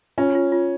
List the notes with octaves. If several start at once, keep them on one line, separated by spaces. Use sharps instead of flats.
C#4 F4
F4
F4